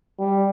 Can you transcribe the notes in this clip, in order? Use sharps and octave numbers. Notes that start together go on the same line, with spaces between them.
G3